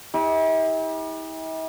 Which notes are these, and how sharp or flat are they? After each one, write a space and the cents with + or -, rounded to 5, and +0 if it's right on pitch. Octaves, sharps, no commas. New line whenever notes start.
E4 -45 G4 +35